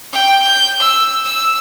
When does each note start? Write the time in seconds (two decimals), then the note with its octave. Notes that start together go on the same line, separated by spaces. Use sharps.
0.13 G5
0.43 G6
0.80 E6
1.25 E6